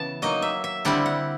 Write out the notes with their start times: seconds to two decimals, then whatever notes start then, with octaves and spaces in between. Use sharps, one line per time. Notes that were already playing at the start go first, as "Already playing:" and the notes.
Already playing: C#3 E3 B3 A5
0.22 F#3 A#3 D#4 D#5
0.42 E5
0.64 E5
0.85 D3 G3 C4 E4 F#5
1.06 F#5